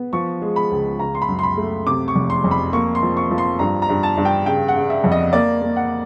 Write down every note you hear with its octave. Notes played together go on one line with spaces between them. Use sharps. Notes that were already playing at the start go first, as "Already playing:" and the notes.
Already playing: B3
F3 C#6
G#3
B5
C#2
C#3 A#5
C6
B5
F#2
C6
B5
A3
C3 D6
C#6
F1
C6
F2
B5
A#3 C#6
C6
F3
C#6
F3
C6
G2 A#5
A#5
G2
A5
G2
G5
C#3 G5
F#5
C#3
E5
F2
D#5
A#3 D5
A#3
F#5